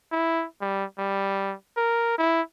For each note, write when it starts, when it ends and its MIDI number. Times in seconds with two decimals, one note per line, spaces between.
0.12 0.45 64
0.61 0.84 55
0.99 1.55 55
1.77 2.14 70
2.18 2.41 64